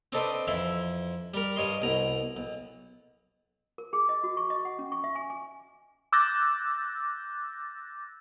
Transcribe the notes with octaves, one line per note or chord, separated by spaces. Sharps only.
C4 D4 D#4 A4 B4 C5
F2 E3 E4 E5 C6
G3 A#4
G2 C#5 D#5 C6
C2 B2 A#5
B1
A#4
G#4
D#5
F#4
C#6
D#5
F#5
C#4
C#6
E5
G#5
G#5
D6 E6 F#6 G6 A6 A#6